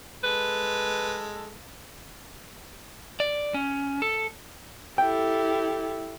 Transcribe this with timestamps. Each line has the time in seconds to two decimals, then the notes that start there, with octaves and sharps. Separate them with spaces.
0.24 G#3 A4 B4
3.20 D5
3.54 C#4
4.02 A4
4.98 E4 G4 A4 G5